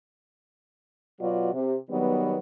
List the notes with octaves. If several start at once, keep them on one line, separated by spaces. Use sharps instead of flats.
B2 F#3 F4 F#4 D5
C3
D#3 F#3 G3 B3